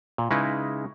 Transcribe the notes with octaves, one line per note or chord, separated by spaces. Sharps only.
A#2
C#3 G#3 D#4 E4 B4